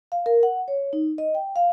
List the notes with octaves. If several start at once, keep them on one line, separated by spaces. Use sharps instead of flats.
F5
A#4
F#5
C#5
D#4
D#5
G5
F5